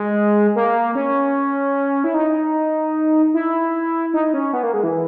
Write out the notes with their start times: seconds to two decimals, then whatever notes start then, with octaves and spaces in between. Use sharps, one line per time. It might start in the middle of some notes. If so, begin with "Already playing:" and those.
Already playing: G#3
0.56 A#3
0.95 C#4
2.04 E4
2.14 D#4
3.34 E4
4.14 D#4
4.34 C#4
4.53 B3
4.63 A#3
4.73 G#3
4.83 E3